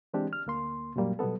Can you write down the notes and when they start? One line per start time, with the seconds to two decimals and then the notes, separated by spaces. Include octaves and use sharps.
0.14 E3 G#3 C4 D4 G4
0.33 F6
0.46 D2 A#3 C6
0.96 F#2 A#2 F#3 G3 A#3
1.19 B2 F#3 G3 B3 A4